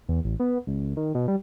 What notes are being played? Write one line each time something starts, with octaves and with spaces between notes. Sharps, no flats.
E2
A1
B3
C#2
D#3
B2
G3